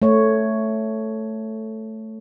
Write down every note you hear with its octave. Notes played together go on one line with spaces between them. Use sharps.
A3 C#5